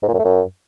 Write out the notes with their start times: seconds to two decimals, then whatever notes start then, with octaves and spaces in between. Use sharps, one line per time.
0.03 G#2
0.08 A#2
0.14 F#2
0.19 A3
0.25 F#2